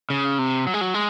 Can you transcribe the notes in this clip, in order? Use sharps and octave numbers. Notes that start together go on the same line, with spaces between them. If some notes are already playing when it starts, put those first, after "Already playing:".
C#3
C3
F#3
G#3
F#3
G#3